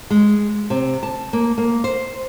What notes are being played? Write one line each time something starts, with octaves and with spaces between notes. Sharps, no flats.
G#3
C3
A5
A#3
A#3
C5